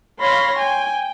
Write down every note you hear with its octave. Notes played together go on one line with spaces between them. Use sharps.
C#5 F5 B5 C6 A#6
G5 G#5